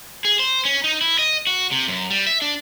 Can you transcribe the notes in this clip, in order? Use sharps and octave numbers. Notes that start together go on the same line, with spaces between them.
G#4
C5
C#4
D#4
E4
D#5
F#4
C3
F#2
G3
E5
D4